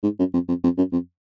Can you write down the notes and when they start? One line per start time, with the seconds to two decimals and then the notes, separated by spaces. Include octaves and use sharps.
0.03 G#2
0.19 F#2
0.33 F2
0.48 F2
0.64 F2
0.78 F#2
0.93 F2